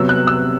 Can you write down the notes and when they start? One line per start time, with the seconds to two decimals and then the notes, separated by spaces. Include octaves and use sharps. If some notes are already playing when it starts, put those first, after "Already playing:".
Already playing: C3 F#3 B3 E6
0.09 F#6
0.27 E6